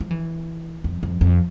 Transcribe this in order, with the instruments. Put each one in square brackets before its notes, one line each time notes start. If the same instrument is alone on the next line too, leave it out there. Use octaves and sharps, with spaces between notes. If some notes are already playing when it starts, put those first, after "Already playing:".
[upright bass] F3
E3
F2
F2
F2